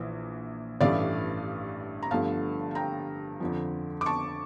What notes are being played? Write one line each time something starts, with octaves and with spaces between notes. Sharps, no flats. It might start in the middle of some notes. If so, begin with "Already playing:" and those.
Already playing: A#1 E3
A1 G2 E3 A3 D5 F5
A#5
G1 G2 D3 F3 A3 F5 A5
A5
G5 A#5
F2 D3 F3
D6
A5 C#6